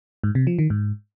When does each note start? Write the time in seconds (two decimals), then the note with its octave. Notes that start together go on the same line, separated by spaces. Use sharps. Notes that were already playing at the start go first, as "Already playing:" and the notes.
0.24 G#2
0.35 C3
0.47 F3
0.59 D#3
0.70 G#2